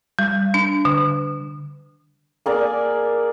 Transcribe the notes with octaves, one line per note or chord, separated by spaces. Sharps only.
G3
D4
D3
A#3 G#4 A#4 D5